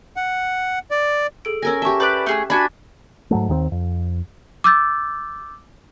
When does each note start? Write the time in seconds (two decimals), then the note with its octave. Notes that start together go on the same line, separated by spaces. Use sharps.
0.16 F#5
0.91 D5
1.45 G#4 A4 D7
1.62 C#4 A#4 G#5 E6 A#6
1.82 G4 E5 A5 C#6
2.00 B4 D5 D6 F#6 G6
2.26 A3 G#4 E6
2.50 D4 F#4 G#5 B5
3.31 G#2 F#3 A3
3.49 D#2 D#3 G#3 C4
3.72 F2
4.64 D6 E6 G6 A6